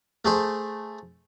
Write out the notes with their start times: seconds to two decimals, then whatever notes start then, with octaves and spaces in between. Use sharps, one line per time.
0.25 A3 G#4 C5